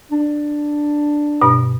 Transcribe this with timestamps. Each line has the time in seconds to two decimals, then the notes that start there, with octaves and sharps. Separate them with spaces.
0.12 D4
1.42 G2 B2